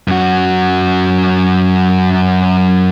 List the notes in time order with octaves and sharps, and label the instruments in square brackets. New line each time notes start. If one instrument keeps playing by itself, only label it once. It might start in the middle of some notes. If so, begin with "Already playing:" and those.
[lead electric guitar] F#2 F#4